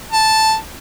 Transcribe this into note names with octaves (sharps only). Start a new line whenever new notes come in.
A5